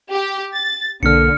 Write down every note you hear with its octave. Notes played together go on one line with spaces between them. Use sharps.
G4
A6
B1 D3 A#3 A4 F6 C#7